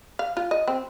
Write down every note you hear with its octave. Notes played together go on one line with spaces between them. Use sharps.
F5
F4
D#5
C4